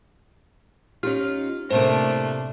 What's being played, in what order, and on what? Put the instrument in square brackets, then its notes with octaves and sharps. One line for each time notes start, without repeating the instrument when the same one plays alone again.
[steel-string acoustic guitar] C#4 D#4 F4 [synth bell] G4 F6
[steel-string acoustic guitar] A2 C3 A#3 [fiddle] A3 D4 [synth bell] C5